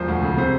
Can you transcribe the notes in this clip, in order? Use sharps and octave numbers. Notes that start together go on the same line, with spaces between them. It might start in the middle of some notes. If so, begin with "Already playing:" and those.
Already playing: E1 F3 C5
D2
C#3
C3 C5